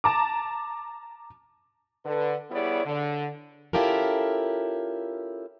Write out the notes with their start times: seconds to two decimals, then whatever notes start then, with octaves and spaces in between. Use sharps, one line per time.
0.04 A5 A#5 D6
2.05 D3 B4
2.51 G3 B3 E4 G#4 C#5 D5
2.85 D3
3.73 C#4 E4 F4 G4 A4 A#4